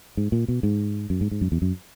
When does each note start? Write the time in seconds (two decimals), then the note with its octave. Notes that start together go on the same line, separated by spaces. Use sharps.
0.17 G#2
0.32 A#2
0.48 B2
0.63 G#2
1.10 F#2
1.21 G#2
1.31 G#2
1.41 F#2
1.52 E2
1.62 F#2